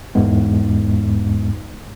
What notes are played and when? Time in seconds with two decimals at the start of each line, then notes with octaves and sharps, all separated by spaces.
0.15 E2 G#2 G#3 B3